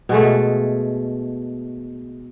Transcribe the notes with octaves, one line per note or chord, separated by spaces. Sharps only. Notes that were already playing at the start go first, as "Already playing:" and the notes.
B2 G#3 A3